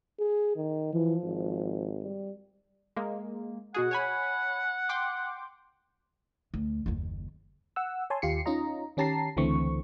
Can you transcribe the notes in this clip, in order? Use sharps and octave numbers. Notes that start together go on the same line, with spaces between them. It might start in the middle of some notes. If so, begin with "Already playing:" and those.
G#4
D#3
E3 F3
G#1
G3
G#3 A#3
B2 F#4 G#4 F#5
C#5 G#5 B5
G5 C6 D6
D2
F#1 D#2
F#5 E6
C#5 G#5 A5 C6
D#2 F4 G4 C7 C#7
C#4 D#4 F4 D#5 A#5
D#3 C#4 G4 A5 A#5 C7
C#2 D3 E3 A3 C4 C#6